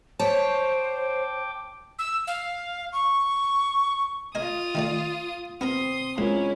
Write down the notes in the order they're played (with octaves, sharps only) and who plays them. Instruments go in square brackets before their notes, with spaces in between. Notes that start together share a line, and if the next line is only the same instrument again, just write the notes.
[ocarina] C5 [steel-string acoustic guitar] C#5 [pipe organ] G5 D6 [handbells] A5
[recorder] E6
F5
C#6
[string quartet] F4 D#6 [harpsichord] A#4 D#5 G#5
[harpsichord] D#3 A3 D5
[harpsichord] B3 A#4 A#5 [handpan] C4 [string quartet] C6 D#6
[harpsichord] A#1 [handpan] G#3 F4 A#4 [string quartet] C#4 E4